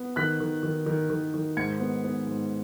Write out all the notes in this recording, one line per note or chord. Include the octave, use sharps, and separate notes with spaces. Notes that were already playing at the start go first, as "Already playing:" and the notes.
Already playing: B3
D#3 F#6 B6
D#3
D#3
D#3
D#3
D#3
G#2 G#6 C#7
B3
B3
G#2